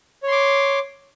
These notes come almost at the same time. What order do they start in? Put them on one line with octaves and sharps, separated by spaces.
C#5 C6 D6